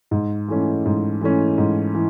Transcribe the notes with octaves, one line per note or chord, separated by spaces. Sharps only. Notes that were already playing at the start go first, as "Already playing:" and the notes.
G#2
E3 A3 C#4
G#2
E3 A3 C#4
G#2
E3